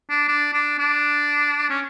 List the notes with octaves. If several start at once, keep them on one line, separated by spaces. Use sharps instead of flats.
D4
D4
D4
D4
C#4